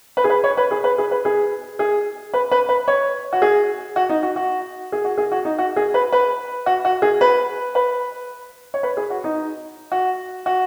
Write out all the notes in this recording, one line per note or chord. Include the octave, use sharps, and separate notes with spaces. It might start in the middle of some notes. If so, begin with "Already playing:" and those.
B4
G#4
B4
C#5
B4
G#4
B4
G#4
B4
G#4
G#4
B4
B4
B4
C#5
F#4
G#4
F#4
D#4
F#4
F#4
G#4
F#4
G#4
F#4
D#4
F#4
G#4
B4
B4
F#4
F#4
G#4
B4
B4
C#5
B4
G#4
F#4
D#4
F#4
F#4